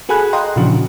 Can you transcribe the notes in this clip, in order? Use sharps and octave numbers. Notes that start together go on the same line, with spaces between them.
F#4 G#4 A4 G#5 B5 F#6
D#5 F5 G5 A#5 C6
A#2 C#3 E3 F3 D4 F#4